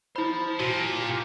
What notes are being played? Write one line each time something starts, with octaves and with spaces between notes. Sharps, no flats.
E4 C5 A5 B5
A#2 F#4
F4 G4